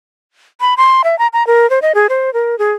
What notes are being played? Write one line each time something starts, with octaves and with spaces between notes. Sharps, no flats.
B5
C6
E5
A#5
A#5
A#4
C5
D#5
G#4
C5
A#4
G#4